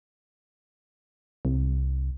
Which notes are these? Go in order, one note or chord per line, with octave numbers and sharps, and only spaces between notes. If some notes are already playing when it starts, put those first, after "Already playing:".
C2